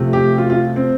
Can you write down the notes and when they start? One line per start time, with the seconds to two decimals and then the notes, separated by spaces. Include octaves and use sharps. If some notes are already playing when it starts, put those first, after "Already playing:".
Already playing: C3 F3 A3
0.13 G4
0.38 F4
0.50 F4
0.76 C4